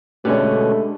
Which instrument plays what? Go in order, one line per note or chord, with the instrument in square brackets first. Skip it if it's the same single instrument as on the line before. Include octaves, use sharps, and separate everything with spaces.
[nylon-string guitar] B2 D3 C#4 [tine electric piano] G#3 D4 G4 [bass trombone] A3